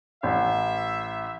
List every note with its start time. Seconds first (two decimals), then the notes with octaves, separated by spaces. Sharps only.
0.23 A1 E5